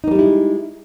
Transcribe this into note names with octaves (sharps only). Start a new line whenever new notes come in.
G3 G#3 A#3 D#4 E4